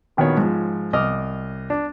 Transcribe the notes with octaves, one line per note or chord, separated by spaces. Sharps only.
A#1 D#3 B3 F#4 C#5
G#2 F3
C2 D#5 D6 F6
D4